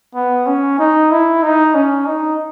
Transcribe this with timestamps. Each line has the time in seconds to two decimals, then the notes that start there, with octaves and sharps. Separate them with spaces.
0.15 B3
0.46 C#4
0.79 D#4
1.11 E4
1.43 D#4
1.75 C#4
2.06 D#4